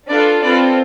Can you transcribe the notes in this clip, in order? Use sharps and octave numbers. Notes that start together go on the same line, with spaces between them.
D4 F4 A4 B4 D5
C4 F4 A4 B4 D5